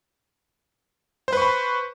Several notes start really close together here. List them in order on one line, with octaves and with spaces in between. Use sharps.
C5 B4 C#6 B5